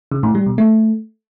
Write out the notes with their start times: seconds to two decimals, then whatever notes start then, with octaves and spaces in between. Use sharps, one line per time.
0.12 C#3
0.23 A2
0.35 G3
0.46 B2
0.58 A3